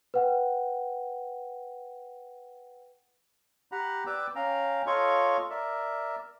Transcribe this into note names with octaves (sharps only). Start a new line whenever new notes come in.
B4 F#5 G5
G4 F#5 A#5 B5
B4 D5 G5 D6 E6
C#4 F5 G5 A#5
F4 A4 C#5 D#5 F5 C#6
A#4 D5 E5